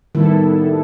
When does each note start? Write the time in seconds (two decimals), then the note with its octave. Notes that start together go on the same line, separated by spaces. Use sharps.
0.15 A2 D#3 G3 B3 E4 A4